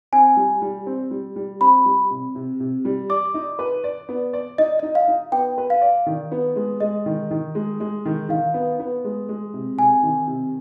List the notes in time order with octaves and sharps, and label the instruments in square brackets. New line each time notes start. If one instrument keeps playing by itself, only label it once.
[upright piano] C4 [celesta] G#5
[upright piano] G3
G3
C4
G3
G3
[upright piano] C4 [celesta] B5
[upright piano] G3
C3
C3
C3
G3
[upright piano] D5 [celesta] D6
[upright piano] D#4
B4
D5
B3
D5
[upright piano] D#4 [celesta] D#5
[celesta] D#5
[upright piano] D#4
[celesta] F5
[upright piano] D#4
[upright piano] B3 [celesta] G5
[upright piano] B4
[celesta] F5
[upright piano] D5
D#3
B3
G#3
[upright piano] G#3 [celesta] D#5
[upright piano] D#3
D#3
G#3
G#3
D#3
[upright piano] D#3 [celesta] F5
[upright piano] B3
B3
G#3
G#3
C3
[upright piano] C3 [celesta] G#5
[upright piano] D#3
C3